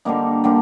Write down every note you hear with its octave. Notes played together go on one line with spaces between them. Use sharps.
D3 G3 A#3 D#4
D3 G3 A#3